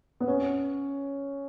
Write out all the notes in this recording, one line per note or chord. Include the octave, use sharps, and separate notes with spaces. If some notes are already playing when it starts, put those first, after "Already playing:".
B3
C#4